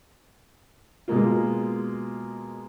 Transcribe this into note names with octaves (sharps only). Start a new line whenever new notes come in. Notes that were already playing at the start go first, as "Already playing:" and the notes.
B2 G#3 A#3 F4